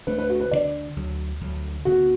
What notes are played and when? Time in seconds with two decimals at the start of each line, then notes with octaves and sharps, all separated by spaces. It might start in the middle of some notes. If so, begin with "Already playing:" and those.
0.07 D2 D3 A3 D4 B4
0.19 B4
0.30 F#4
0.40 B4
0.51 D2 D3 A3 D4 D5
0.96 D2 D3 F#3
1.41 D2 D3 F#3
1.85 D2 D3 B3 F#4